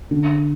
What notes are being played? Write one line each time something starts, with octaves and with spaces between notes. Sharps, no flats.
D3